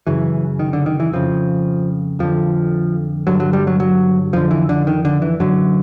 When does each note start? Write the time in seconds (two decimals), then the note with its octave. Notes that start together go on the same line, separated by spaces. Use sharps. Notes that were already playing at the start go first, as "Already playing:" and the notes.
0.07 F#2 C#3 E3
0.59 D#3
0.73 D3
0.86 D#3
1.00 E3
1.13 F2 C#3 F3
2.19 F2 D3 F3
3.27 G2 D3 F#3
3.40 F#3
3.53 G3
3.67 F#3
3.80 F#3
4.33 F2 D3 F3
4.51 E3
4.69 D3
4.87 D#3
5.05 D3
5.22 E3
5.40 F#2 D3 F#3